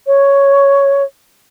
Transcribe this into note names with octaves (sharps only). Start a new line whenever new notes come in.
C#5